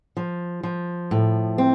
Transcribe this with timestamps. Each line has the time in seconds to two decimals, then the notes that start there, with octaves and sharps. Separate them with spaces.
0.17 F3
0.63 F3
1.11 A2
1.58 C4